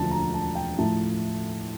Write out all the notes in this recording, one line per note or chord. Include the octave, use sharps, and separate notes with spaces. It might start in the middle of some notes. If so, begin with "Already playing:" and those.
Already playing: E1 D2 D3 F3 A5
A#5
A5
G5
A2 F3 A5